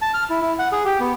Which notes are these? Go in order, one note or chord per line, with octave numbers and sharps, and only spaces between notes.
A5
F6
E4
E4
F#5
G#4
G4
B3